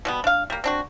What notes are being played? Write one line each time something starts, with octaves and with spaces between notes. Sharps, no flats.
B2 G3 B3
D4 F5
G3 A#3
C4 D4 F#4